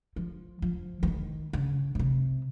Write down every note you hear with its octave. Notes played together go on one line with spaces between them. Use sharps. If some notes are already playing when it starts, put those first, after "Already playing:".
F3
F3
F3
D#3
C#3
A#2
C3